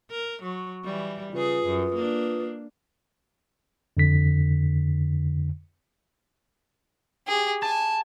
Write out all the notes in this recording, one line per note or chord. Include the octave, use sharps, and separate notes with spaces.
A#4
F#3 C#6
E3 G3
C#3 F4 G#4 B4 D#6
F#2
A#3 D4
F2 D3 B6
G4 G#4
G#5 A5